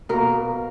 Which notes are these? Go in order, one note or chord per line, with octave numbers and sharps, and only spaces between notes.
B2 A#3 A#4